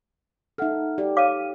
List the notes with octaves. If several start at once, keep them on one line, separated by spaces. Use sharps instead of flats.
D#4 A4 E5 F#5 F6
G4 D5
C#5 F5 D6 F6 D#7